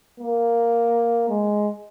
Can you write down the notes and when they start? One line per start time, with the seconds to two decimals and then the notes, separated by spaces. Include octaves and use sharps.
0.20 A#3
1.29 G#3